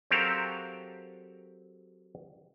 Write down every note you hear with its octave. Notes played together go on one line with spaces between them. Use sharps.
F#3 C4 G4 A4 A#4 F5